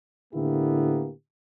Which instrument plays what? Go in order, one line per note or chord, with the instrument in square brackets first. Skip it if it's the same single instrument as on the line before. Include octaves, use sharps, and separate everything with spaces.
[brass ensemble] A2 D3 A#3 B3 E4 G4